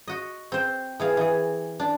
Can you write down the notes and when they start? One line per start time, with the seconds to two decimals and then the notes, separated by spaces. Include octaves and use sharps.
0.08 F#4 D#5
0.52 C4 C5
1.00 E3 G#4 F5
1.17 E3 G#4
1.80 D4